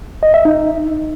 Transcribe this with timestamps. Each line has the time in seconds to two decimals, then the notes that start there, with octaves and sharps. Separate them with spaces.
0.23 D#5
0.34 E5
0.45 D#4